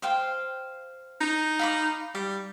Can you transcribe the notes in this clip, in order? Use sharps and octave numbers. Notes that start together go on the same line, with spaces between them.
C5 F5 G5
D#4
F5 B5 D6
G3 D6